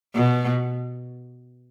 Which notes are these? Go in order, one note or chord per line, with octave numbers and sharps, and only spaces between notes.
B2